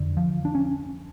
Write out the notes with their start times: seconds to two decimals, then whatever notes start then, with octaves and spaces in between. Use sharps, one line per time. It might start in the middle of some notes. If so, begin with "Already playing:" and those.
Already playing: F2 D3
0.17 F3
0.45 D4
0.55 C#4